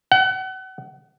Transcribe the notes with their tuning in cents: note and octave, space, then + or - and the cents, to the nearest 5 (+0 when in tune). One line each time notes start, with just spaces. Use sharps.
F#5 +35